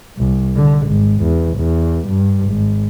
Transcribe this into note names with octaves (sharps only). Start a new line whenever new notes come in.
C2
D3
G#1
E2
E2
G2
G#1